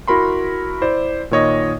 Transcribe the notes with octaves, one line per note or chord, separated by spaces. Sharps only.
E4 F#4 A#4 B5 C6
E4 C5 D5
A#2 D#3 C#5 D#5